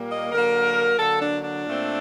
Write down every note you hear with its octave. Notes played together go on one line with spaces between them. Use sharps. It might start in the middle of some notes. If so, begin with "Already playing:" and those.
Already playing: A#2 G3 A#3
D#5
D3 F#3 A#3 A#4
D3 F#3 A#3 A4
D4
D4
A#2 A3 C4